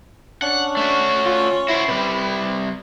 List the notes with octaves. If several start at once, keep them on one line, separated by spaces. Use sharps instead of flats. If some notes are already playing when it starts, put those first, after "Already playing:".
C#4 D4 F#5
A3 F#4
F4
E4 F#4 C5
C3 G3 B4